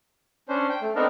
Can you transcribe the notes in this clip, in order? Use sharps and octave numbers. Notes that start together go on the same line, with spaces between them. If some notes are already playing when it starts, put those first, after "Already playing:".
C#4 D4 C5
G5
A3
B3 C4 D4 D#4 A4 A#4